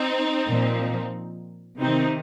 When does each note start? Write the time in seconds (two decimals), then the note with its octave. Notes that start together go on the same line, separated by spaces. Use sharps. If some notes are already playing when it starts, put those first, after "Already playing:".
Already playing: C4 D#4
0.48 A#2 F3
1.80 C3 D#3 C4 D#4